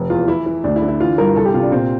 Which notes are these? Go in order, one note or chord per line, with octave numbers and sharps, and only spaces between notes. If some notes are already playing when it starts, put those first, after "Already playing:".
Already playing: F1
E2 F4
E3 E4
E3
D2 D4
E4
D3
E4
E3 F4
G2 A#4
C2 A4
G4
C3 F4
D4
A#2 C4